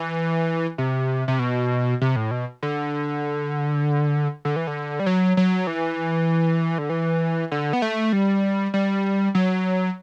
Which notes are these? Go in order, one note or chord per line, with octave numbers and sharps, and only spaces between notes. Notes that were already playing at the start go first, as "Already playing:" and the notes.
Already playing: E3
C3
C3
B2
C3
A2
B2
D3
D3
E3
D3
G3
F#3
F#3
E3
D3
E3
D3
B3
A3
G3
G3
F#3